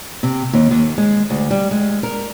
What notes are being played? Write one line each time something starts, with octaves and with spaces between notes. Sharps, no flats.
C3
D#2
D#2
G#3
D2
G3
G#3
A#4